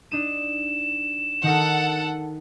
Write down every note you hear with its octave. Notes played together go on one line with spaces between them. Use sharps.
D4 D#4 D#7 E7
D#3 D#4 A4 A#4 F#5